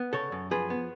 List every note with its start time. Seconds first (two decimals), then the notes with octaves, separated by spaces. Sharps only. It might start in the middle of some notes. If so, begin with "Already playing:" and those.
Already playing: B3
0.13 C#3 A4 C#5
0.32 F#2
0.51 F3 G#4 B4
0.70 B3